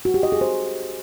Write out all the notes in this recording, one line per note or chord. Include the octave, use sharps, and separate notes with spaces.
F#4
G4
D#5
G#4
C5